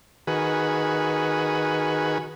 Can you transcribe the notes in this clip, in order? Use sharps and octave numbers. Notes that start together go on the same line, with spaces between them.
D#3 F#4 G#4 B4